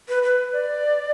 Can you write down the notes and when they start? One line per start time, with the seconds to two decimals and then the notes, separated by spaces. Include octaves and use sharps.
0.09 B4
0.23 B4
0.53 D5